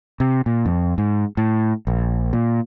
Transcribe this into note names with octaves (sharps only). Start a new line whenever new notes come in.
C3
A#2
F2
G#2
A2
A#1
A#2